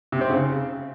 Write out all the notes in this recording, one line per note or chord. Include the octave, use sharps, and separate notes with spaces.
C3
C4
C#3